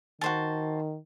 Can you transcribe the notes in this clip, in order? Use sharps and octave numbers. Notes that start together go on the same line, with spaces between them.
D#3 F#4 C5 A5